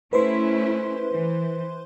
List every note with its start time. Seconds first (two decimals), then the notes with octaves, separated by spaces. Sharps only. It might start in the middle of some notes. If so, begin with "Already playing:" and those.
0.13 A3 C#4 E4 B4 C5 C6
1.11 E3